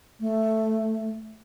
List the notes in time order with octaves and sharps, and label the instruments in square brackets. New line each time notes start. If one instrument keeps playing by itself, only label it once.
[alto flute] A3